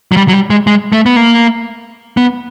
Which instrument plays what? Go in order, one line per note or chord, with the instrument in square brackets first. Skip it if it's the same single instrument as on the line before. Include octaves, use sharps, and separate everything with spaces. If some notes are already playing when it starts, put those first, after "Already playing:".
[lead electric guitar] F#3
G3
F#3
G3
G#3
G#3
A3
B3
A#3
B3